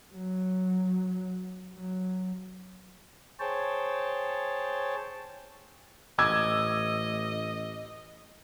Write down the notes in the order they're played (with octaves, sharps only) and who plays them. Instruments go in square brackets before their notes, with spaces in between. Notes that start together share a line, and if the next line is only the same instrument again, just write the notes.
[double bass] F#3
F#3
[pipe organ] G#4 C5 C#5 G5 A5
[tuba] A1 [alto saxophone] D#5 [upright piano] D6 E6 G#6